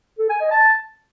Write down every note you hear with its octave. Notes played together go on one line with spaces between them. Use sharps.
A4
G#5
D#5
A5